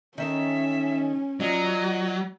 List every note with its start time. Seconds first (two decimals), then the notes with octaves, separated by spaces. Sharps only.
0.18 D#3 C#4 D#4 A4 E5
1.40 D#2 F#3 F4 D5 D#5